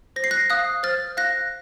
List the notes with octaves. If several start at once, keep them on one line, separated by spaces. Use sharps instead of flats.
C5 A#6
C7
F#6 A#6
F5 D#6 F#6
C5 F6 A6
F5 F#6 A#6